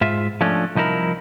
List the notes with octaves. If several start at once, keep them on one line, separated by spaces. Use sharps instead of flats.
G#2 F4 E5
F3 A3 C#4 D4
C2 F3 D#4 E4 A#4